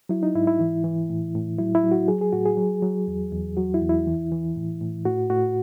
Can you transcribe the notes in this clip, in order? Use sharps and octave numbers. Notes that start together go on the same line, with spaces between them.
F#3 E4
D#4
G#2 E4
E4
E3
E3
A2
A2
F#3 E4
E4
F#3
F#4
F#3 G#4
G#4
A2 F#4
G#4
F#3
F#3
E2
E2
F#3 F#4
E4
E2
E4
E3
E3
A2
A2
A2 F#4
A2 F#4